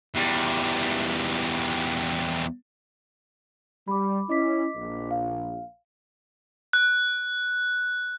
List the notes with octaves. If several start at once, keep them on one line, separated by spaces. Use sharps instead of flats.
E2 G3
G3 B5 D6
C#4 E4 D#5 D6 B6
A#1
F5
F#6